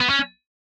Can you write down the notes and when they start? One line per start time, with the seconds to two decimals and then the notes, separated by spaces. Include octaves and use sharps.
0.01 B3
0.10 C#4